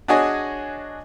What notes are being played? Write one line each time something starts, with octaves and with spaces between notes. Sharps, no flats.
D4 F#4 G#4 C#5 D#5 G#5